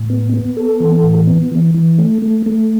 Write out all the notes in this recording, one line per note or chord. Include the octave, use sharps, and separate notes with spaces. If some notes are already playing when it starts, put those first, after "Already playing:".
Already playing: A2
B3
B3
A4
E3
A2
B3
E3
E3
A3
A3
A3